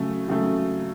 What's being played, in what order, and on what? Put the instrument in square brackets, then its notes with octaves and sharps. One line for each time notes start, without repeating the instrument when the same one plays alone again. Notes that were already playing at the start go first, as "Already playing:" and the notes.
Already playing: [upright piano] C#3 F#3 A3
C#3 F#3 A3